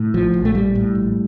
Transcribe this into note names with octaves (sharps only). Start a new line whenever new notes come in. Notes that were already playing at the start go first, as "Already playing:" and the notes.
Already playing: A2
A#1 F3
A#1
A3
A2 G3
A2
A#1